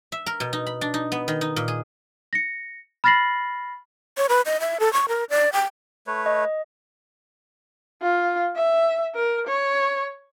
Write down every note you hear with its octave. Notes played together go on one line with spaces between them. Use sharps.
E5
A#4
B2
D#4
B5
D4
D#4
B3
D#3
D#4
A#2
G#4
A#6 C#7
B5 F6 A6 A#6 C7 F#7
C#5
B4
D#5
E5
A4
C#6
A#4
D5
G5
A3 B4 C#5
D#5
F4
E5
A#4
C#5